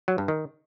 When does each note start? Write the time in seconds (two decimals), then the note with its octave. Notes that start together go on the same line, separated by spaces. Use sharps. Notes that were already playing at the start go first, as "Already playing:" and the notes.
0.08 F#3
0.18 G2
0.28 D#3